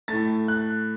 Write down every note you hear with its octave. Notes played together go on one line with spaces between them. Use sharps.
A2 A3 A6
F#6